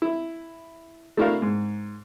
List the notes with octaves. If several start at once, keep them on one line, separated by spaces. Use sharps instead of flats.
E4
A3 D4 E4 F#4 A#4 F5
G#2